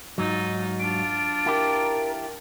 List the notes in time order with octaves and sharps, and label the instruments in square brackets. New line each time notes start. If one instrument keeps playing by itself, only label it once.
[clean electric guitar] G#2 F#3 [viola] D#4 F4
[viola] D4 F4 [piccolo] D7
[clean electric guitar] E4 G4 [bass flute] A#4